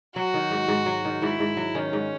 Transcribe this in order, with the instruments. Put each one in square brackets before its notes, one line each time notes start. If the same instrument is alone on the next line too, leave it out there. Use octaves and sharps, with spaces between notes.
[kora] F#3 [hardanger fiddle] F#4
[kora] D#3
G#2
G#2
F#3
D#3
[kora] G#2 [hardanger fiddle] E4
[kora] G#2
F#3
[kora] D#3 [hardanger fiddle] C#4
[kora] G#2